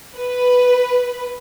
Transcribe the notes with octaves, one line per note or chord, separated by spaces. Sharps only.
B4